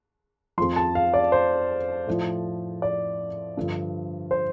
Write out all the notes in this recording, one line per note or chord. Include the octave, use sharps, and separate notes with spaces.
F2 F3 C6
A5
F5
D5
C5
A2 F3
D5
G2 D3 F3
C5